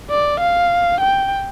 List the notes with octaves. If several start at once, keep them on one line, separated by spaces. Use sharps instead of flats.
D5
F5
G5